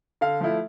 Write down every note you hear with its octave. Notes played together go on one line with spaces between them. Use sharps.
D3 F5
F3 A3 E4